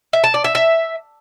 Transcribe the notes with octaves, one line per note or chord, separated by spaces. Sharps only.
E5
A5
D5
E5
E5